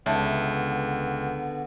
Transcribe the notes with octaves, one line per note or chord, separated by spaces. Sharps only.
C#2 D3 B3 C#5 E5 A5